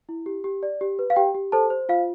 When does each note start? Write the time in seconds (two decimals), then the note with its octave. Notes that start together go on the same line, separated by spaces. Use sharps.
0.09 E4
0.26 G4
0.44 G4
0.63 D5
0.81 G4
0.99 B4
1.10 F5
1.16 G4 G5
1.35 G4
1.52 A4 C5 A5
1.70 C5
1.89 F4 F5